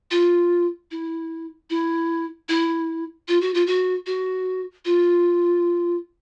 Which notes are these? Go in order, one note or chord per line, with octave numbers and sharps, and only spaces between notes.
F4
E4
E4
E4
F4
F#4
F4
F#4
F#4
F4